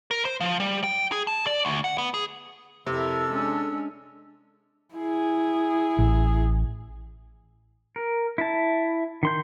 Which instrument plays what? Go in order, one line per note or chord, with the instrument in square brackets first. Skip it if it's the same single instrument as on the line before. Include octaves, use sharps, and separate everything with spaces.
[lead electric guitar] A#4
C5
F3
G3
G5
G#4
A5
D5
D2
F#5
B3
G#4
[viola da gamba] F2 E4 A#4 [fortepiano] C3 [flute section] A4 E6
[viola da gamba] G#3 C#4 D4
[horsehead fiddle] E4 G#4
[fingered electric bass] A1
[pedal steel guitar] A#4
E4 A5
D#3 C6 G6